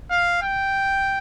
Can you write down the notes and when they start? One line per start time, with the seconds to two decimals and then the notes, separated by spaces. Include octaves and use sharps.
0.11 F5
0.42 G5